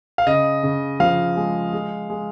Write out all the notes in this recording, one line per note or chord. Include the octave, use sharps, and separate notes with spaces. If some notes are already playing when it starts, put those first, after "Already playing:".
F5
C#3 D#5
C#3
F3 F5
G#3
G#3
G#3